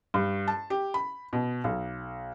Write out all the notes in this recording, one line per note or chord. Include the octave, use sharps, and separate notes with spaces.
G2
A5
G4
B5
B2
B1